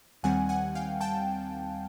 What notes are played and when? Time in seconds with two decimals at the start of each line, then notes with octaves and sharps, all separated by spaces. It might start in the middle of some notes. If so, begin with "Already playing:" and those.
0.23 D#2 D#3 G3 C4 F#5 G#5
0.49 F#5 G#5
0.75 F5 G5
1.01 G5 A5